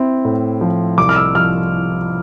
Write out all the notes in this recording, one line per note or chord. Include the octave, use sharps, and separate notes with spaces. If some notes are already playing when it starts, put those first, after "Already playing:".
Already playing: C4 E4
A2
F3
C2 D6
F6
E6
F3 F6